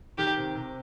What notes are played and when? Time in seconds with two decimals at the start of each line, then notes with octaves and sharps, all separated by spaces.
0.18 D#3 G4
0.37 C3
0.55 C3